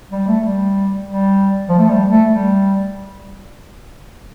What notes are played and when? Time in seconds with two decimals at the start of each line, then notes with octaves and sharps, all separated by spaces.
0.12 G3
0.27 A3
0.43 G3
1.06 G3
1.69 F3
1.78 A3
1.89 G3
2.09 A3
2.31 G3